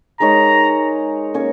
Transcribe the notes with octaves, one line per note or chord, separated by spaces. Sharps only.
G#3 D#4 A#4 C#5 A#5
A#3 C#4 A#4 C#5